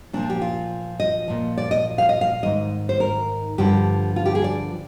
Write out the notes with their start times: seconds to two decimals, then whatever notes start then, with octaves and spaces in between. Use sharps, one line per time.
0.13 A#2 F3 D4
0.30 G4
0.42 F4
1.00 D#5
1.28 A#2 F3
1.58 D5
1.71 D#5
1.98 F5
2.09 D#5
2.21 F5
2.43 G#2 D#3 D#5
2.89 C5
3.00 A#4
3.58 G2 D3 F3 G4
4.16 F4
4.26 G4
4.35 G#4
4.44 D5